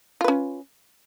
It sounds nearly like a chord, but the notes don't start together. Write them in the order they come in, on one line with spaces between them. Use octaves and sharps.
F4 B4 C#4